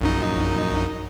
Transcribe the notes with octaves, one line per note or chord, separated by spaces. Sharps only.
A#1 F#2 D#4